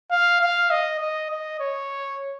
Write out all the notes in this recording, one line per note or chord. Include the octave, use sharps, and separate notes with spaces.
F5
F5
D#5
D#5
D#5
C#5